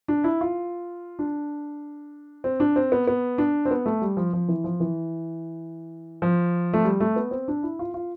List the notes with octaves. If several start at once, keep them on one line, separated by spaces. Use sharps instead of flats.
D4
E4
F4
D4
C4
D4
C4
B3
B3
D4
C4
B3
A3
G3
F3
F3
E3
F3
E3
F3
A3
G3
A3
B3
C4
D4
E4
F4
F4